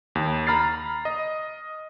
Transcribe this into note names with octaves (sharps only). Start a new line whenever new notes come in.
D#2
A#5 B5 F6 A6 C7
D#5